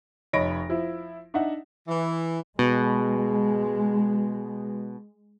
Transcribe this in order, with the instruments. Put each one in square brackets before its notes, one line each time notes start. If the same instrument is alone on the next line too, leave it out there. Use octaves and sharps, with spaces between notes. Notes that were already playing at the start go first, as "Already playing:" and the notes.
[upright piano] F1 C#5 D#5 B5 A#6 D7
F3 E4
D4 D#4 E5 F#5
[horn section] E3
[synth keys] B2 [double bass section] G#3